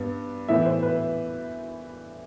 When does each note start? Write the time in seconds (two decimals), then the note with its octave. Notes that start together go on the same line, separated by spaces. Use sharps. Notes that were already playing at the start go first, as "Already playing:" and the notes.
Already playing: G2 B3
0.48 A2 E3 B3 E5
0.66 C5
0.83 B4